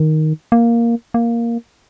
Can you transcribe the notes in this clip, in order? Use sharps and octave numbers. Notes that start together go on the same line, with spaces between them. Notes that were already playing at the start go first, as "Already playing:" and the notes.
Already playing: D#3
A#3
A#3